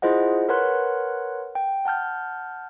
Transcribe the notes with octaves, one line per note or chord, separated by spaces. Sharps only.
E4 F4 G#4 C5 D#5 F#5
A#4 B4 C#5 F#5 C6 F#6
G5
F#5 A5 F6 G6